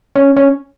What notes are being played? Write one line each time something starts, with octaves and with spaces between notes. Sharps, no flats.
C#4
C#4